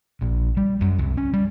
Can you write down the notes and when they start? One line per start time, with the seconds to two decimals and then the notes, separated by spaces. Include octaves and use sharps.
0.21 A#1
0.57 G3
0.81 F#2
0.99 C2
1.17 C#4
1.33 G3